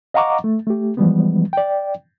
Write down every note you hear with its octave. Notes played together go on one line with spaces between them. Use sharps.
D#5 F5 F#5 A#5 C#6 D6
A3
A3 G4
E3 F3 G3 G#3 B3
D5 G5